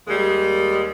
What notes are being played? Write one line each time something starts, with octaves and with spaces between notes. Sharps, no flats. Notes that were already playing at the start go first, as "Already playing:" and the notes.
D#2 G3 G#3